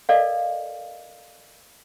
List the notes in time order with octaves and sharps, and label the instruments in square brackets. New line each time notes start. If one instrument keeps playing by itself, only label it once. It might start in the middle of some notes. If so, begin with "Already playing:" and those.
[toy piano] A4 A#4 D5 D#5 F5